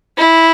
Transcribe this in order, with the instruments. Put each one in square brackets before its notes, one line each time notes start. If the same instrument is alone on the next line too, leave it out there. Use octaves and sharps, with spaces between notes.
[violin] E4